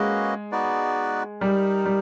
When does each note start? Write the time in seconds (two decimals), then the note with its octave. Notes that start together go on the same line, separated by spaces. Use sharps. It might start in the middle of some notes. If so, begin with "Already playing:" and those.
Already playing: G#3 A#3 C#4 F#4 B4 D#5
0.52 B3 D#4 F#4 B4 D5
1.41 G3 D#4 G4 A#4
1.86 G3